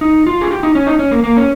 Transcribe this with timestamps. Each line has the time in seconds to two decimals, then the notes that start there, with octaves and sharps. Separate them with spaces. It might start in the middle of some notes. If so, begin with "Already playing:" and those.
0.01 D#4
0.27 F4
0.41 G#4
0.51 G4
0.63 D#4
0.75 C#4
0.87 D#4
0.99 C#4
1.11 A#3
1.24 A#3
1.37 C#4